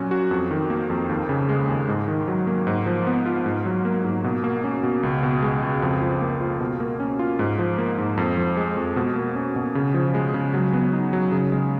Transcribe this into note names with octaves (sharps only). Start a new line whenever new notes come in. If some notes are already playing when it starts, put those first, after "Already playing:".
Already playing: A#2 F#3 C#4
F#4
F2
D#3
A#3
F2
D#2
C#3
G#3
D#2
G#2
D#3
F#3
A#3
G#2
F3
B3
F4
G#2
F#3
A#3
G#2
B2
A#3
C#4
B2
C#2
B2
G#3
C#2
F2
F3
A#3
F4
B2
A#3
C#4
F4
G#2
F3
A#3
G#2
F2
F3
G#3
F2
B2
A#3
C#4
B2
C#3
F3
G#3
C#3
F#3
B3
D#4
F#3
C#3
G#3